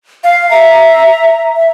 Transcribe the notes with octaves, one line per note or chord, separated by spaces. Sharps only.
F5
E5 A#5
E5